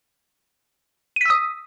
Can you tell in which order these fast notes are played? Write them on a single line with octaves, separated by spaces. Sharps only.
D#7 B6 E6 D#6